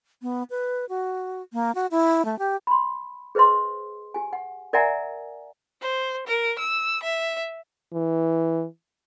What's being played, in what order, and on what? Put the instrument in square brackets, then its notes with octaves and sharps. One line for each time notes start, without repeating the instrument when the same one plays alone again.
[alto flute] B3
B4
F#4
A#3
F#4
E4
A3
G4
[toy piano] B5 C6
G#4 B4 C5 D#5 C6
G4 G#5
F#5
A#4 D5 E5 F#5 G#5 A#5
[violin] C5
A#4
E6
E5
[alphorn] E3